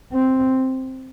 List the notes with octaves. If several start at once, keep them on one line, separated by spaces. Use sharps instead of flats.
C4